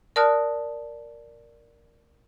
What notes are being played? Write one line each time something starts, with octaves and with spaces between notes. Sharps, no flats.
A#4 D5 A5 D#6 F6 F#6